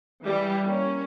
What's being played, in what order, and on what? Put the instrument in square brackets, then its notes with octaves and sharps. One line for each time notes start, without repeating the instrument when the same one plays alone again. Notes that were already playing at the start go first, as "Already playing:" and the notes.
[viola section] E3 G3 E4
A#3 C#4